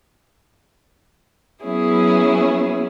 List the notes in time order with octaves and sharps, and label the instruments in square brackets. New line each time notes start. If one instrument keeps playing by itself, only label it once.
[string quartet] F#3 B3 C#4 E4 G#4